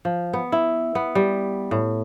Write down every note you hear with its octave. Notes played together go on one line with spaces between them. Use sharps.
F3
B3
E4
B3
G3
A2